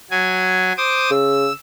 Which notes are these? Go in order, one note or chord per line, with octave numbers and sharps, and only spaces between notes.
F#3 G#5
C5 D6 D#6
C#3 E6